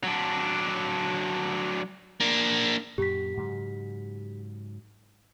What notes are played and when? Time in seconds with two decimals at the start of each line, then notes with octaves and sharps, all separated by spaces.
0.03 F#3 D4
2.20 A#3 D4
2.98 F#2 A#2 G4 B6
3.37 G#2 C#3 F#3